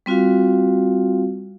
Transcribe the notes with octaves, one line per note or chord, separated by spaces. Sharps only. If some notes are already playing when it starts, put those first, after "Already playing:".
G3 C4 F4 F#4 F5